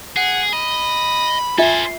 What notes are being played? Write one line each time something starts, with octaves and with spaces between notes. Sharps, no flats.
G#4 F#5
D#5 B5
F4 A4 C5 E5 G#5